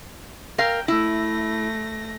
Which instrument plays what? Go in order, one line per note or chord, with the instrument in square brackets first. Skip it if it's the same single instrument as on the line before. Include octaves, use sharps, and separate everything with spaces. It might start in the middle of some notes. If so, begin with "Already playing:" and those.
[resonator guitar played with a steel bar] A#4 F5 [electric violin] G5
[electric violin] A3 A#6 [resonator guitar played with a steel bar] E4